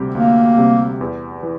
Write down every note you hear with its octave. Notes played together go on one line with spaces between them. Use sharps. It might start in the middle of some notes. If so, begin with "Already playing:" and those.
Already playing: D2 C3 G3 C4 G4
D2 A#3
C3 G3 C4 G4
E2
E3